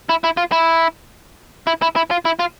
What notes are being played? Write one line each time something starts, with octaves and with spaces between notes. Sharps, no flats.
E4
E4
F4
E4
E4
E4
E4
F4
E4
F4